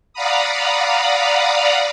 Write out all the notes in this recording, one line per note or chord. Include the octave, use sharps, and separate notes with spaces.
D5 F5 F#5 A#5 B5 D#6